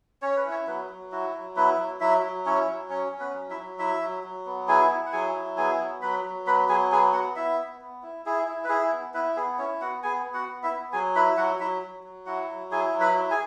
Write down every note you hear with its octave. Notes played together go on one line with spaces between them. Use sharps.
C#4 C#5
B4
E4
C#4 C#5
F#3 B3 B4
F#3
E4 F#4
F#3
B3 E4 B4
F#3
F#3 E4 E5
F#3
C#4 E4 C#5
F#3
C#4 C#5
C#4
B3 B4
F#3
E4 E5
F#3
E4 E5
F#3
F#3
B3
E4 G#4 G#5
E4
F#5
F#3 G#4 G#5
E4
B3 G#4 G#5
F#3
F#3 B4 B5
F#3
B3 B4 B5
F#3 G#4 G#5
B3 G#4 G#5
B3 F#4 F#5
B3 E4 E5
B3
B3
E4
E4 G#4
E4
B4
E4 G#4
B3
B3 E4 B4
B3 G#4
C#4 E4 C#5
B3 F#4 F#5
B3 G#4 G#5
B3
F#4 F#5
B3
E4 E5
B3
F#3 G#4 G#5
E4 B4 B5
F#3 F#4 F#5
F#3 E4 E5
F#3
F#3
E4 F#4 F#5
F#3
E4 G#4 G#5
F#3
B4 B5
E4
G#4 G#5